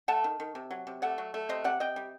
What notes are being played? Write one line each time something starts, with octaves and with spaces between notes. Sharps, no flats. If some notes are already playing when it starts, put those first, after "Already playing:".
A3 F#5 A5
D#3
D#3
C3
F#3
C3
A3 D5 F#5
F#3
A3
C3 C5 D#5
C3 D5 F#5
C3 D#5 G5
G3